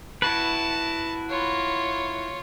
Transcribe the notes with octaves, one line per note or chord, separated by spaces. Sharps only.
E4 F#4 B4 A5
F4 C#5